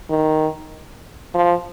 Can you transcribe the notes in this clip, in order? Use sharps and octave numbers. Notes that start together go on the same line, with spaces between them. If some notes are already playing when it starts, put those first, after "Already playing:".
D#3
F3